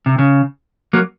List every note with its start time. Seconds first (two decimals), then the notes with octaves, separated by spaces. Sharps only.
0.06 C3
0.18 C#3
0.93 F#3 A#3